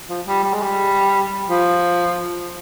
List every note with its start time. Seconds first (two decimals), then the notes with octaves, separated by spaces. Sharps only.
0.09 F3
0.27 G3
0.44 G3
0.53 G#3
0.62 G3
1.49 F3